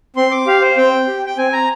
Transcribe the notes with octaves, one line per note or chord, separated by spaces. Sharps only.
C4 C6
D6
G4 F5
C5
C4 G5
G4
G5
C4 G#5
A#5